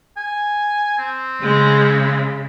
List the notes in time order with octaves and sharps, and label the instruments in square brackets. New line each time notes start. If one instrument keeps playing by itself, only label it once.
[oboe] G#5
C4
[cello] C#3 [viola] G#3